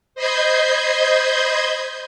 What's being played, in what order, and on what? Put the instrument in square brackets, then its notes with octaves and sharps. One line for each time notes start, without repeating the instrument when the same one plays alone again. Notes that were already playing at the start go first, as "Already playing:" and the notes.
[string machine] C5 D#5 B5 C6 G6 G#6